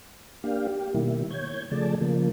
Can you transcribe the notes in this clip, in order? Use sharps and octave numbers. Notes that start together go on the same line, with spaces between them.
A#3 D4 G4 F5
G4
B2 D#3 G3 A#3 E4
C#5 G6 G#6
C#3 F3 A3 G#4 D5 A5
C#3 F3 A#3